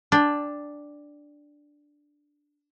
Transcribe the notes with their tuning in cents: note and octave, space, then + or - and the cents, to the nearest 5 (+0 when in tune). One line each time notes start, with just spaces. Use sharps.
D4 +0 G5 +30